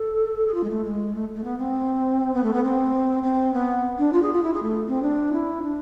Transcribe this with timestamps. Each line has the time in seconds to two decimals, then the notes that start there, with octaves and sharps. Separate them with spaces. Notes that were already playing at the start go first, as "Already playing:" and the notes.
Already playing: A4
0.47 G#4
0.54 F4
0.63 G#3
0.69 A3
0.84 G#3
1.14 A3
1.35 A3
1.44 B3
1.58 C4
2.34 B3
2.43 A3
2.53 B3
2.63 C4
3.23 C4
3.53 B3
3.98 D4
4.13 F4
4.22 G#4
4.33 F4
4.43 E4
4.53 G#4
4.62 A3
4.87 C4
5.02 D4
5.32 E4
5.62 D4